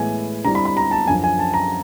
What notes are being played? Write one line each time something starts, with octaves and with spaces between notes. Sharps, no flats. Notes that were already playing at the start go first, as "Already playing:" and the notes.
Already playing: A2 E3 G#3 B3 E4 G#5
D3 G3 C4 E4 A#5
B5
B5
A#5
A5
F#2 D3 F3 G#5
G#5
A5
A#5